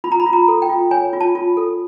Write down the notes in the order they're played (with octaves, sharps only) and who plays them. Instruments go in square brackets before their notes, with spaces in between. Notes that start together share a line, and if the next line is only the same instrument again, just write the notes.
[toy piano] F4 B5
A#5
B5
F4
A#5
A4
G5
F4
C#5 G#5
F4
A5
F4
A4